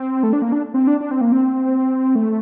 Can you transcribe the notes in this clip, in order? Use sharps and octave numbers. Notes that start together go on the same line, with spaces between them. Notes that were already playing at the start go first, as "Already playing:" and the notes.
Already playing: C4
A3
D4
A#3
D4
C4
D4
D4
C4
A#3
C4
A3